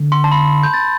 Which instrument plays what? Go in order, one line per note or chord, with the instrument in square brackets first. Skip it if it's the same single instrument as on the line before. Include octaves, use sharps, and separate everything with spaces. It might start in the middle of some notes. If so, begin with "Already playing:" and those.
Already playing: [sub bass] D3
[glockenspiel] C6
A5
B5
G6
A6